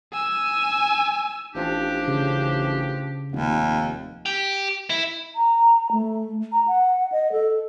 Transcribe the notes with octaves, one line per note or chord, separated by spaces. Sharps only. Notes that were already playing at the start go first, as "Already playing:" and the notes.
G#5 E6
A1 F3 D4 G4
C#3
F1 D#2
G4
E4
A#5
A3
A#5
F#5
D#5
A4